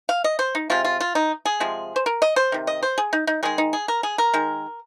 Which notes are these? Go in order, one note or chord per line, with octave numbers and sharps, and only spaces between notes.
F5
D#5
C5
D#4
C3 G#3 F4
F4
F4
D#4
G#4
C3 F3 G#3
C5
A#4
D#5
C5
C3 D#3
D#5
C5
G#4
D#4
D#4
D#3 G#3 G#4
D#4
G#4
A#4
G#4
A#4
D#3 G#3